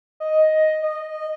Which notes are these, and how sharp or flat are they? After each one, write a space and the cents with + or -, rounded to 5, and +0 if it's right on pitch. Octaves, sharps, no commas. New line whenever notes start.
D#5 +5
D#5 -15